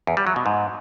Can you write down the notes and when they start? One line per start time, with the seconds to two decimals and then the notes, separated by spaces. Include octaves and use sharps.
0.07 E2
0.17 G3
0.27 F#3
0.36 B2
0.46 G#2